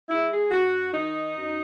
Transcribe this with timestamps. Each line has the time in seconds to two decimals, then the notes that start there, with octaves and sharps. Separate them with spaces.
0.08 G#3 E4
0.30 G#4
0.50 F#2 F#4
0.91 D#3 D#4
1.33 F#2